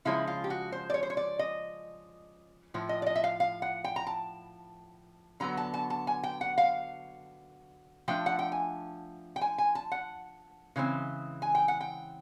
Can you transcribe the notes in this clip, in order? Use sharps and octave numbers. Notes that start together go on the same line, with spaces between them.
C#3 F3 G#3 C#4 E4
F4
G4
F#4
C5
D5
C#5
C5
C#5
D5
D#5
A2 F3
D#5
D5
D#5
E5
F5
F5
F#5
G5
A#5
A5
D3 F#3 B3 A#5
A5
A5
A5
G#5
G5
F#5
F5
F3 A3 D4 G5
F#5
G5
G#5
G5
G#5
G#5
A5
F#5
C#3 E3 G#3 C4
G#5
G5
F#5
G5